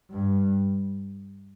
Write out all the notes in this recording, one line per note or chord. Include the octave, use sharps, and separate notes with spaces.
G2